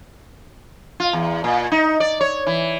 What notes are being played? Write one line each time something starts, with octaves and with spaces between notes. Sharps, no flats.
F4
E2
A#2
D#4
D5
C#5
E3